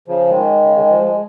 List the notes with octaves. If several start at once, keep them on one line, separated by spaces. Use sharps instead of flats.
C#3 F3
D#3 G#3
C#3
D#3
F3
G#3